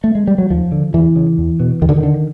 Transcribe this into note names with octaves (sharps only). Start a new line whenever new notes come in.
A3
G#3
G3
F#3
D#2 F3
D3
E2 E3
C#3
E2
B2
D#2 D#3
D3
D#3
D3